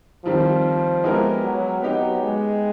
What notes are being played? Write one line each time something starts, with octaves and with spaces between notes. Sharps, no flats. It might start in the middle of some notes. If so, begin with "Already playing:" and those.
D#3 F3 G3 C4
G#3 B3 E4 G4 A#4
F#3
F#3 B3 D#4 G4
G#3